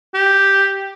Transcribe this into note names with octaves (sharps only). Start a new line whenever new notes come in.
G4